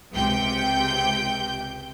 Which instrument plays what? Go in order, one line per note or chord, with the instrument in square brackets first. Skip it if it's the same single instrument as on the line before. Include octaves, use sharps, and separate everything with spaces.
[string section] C#2 C3 G5 G6